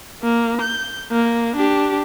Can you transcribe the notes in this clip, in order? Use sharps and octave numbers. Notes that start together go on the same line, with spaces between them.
A#3
G6
A#3
D4 G4